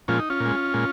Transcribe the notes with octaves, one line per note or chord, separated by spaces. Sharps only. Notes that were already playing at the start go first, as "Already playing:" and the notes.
A#2 F3 G#3 C#4 F4
D#4
C#4 F4
A#2
G#3
A#2 G#3